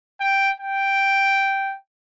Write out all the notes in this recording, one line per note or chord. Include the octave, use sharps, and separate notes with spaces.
G5
G5